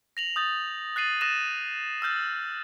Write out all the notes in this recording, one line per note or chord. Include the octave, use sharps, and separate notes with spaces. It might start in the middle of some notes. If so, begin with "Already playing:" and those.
A#6 F7 F#7
D#6 G6 A6
F#6 A6 C7 D#7 F#7
D#6 F#6 A6 A#6 D#7 E7
E6 F6 G6 A6